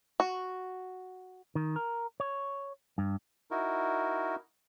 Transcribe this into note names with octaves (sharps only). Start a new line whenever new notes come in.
F#4
D#3
A#4
C#5
G2
D#4 E4 F#4 A#4